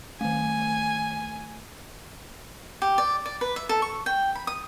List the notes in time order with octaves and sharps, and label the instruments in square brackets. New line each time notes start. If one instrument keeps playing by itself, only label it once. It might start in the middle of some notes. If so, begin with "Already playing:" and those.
[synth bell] D#3 A3 [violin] G#5
[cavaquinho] G4
D5
D5
B4
E5
A4
C#6
G5
B5
D#6